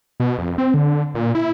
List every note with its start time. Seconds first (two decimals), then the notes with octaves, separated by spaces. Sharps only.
0.20 B2
0.38 F2
0.58 C4
0.74 D3
1.15 A#2
1.35 E4